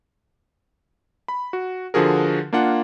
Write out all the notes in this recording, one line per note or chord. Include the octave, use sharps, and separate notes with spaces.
B5
F#4
D3 F3 F#4 G#4 A#4
A#3 D4 F4 F#5